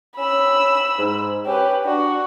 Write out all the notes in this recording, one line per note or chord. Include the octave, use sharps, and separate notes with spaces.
C#4 B5 E6
G#2
C#4 G4 B4
D4 F#4